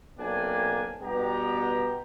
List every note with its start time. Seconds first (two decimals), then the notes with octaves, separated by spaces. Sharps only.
0.19 B1 C3 A#3 D4 G5 G#5
1.02 G2 B2 B3 G4 A#5